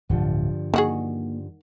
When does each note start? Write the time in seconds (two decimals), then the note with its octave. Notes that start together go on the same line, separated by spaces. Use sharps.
0.09 D1 G2 D3 F3
0.74 D#3 A#3 F#4 G#4